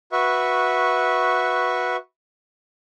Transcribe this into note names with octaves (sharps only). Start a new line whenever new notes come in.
F#4 B4 E5 C#6